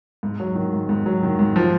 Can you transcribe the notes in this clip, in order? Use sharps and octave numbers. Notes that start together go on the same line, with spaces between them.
G#2
F#3
D#3
G#2
G#2
F#3
D#3
G#2
F3